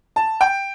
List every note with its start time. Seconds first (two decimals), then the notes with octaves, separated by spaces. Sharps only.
0.16 A5
0.41 G5